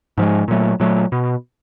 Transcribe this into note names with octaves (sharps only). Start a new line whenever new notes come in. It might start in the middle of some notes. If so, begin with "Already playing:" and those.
G#2 F3 G#3
A#2 F#3 A3
A#2 F#3 A3
B2